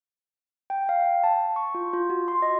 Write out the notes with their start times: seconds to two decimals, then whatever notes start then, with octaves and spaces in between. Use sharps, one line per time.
0.70 G5
0.89 F5
1.02 G5
1.24 A5
1.56 C#6
1.75 F4
1.93 F4
2.10 F#4
2.28 C6
2.42 D#5